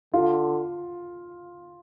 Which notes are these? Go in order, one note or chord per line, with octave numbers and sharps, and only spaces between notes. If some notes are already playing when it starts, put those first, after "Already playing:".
D3 F4